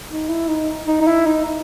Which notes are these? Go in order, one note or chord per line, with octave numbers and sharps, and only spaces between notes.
D#4
E4
D#4
D#4
D#4
E4
D#4
D#4